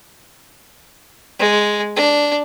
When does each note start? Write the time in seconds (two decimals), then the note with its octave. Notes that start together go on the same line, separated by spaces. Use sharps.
1.39 G#3
1.95 D4